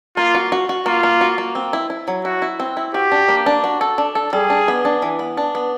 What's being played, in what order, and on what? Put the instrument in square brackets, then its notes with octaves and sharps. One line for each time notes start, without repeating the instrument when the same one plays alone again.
[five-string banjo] A#3 [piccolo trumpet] F4
[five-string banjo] F#4
F#4
F#4
[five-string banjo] A#3 [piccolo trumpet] F4
[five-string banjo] A#3
F#4
A#3
C4
E4
E4
F#3
[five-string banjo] E4 [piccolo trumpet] F#4
[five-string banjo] E4
C4
E4
[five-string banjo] F#4 [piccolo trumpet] G4
[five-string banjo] D4
A#3
D4
F#4
A4
D4
A4
[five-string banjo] G3 [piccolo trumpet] G#4
[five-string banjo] D4
B3
D4
E3
B3
D4
B3